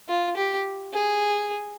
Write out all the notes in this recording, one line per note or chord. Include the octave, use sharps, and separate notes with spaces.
F4
G4
G#4